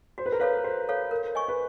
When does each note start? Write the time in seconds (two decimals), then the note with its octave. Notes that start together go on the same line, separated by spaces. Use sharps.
0.18 F#4 C5
0.26 B4
0.32 A#4
0.40 A4 B4 C#5 F5
0.64 F#4 C5
0.89 A4 C#5 F5
1.11 A#4
1.35 D#5 G#5 C#6
1.48 B4